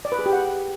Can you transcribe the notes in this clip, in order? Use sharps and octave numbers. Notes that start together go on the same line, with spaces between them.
D5
B4
G#4
G4
F#5